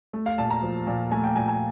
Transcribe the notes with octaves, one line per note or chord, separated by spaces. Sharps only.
A3
F5
A#2 A5
A#5
F3
A#2
A3 G#5
G5
A#2 G#5
G#5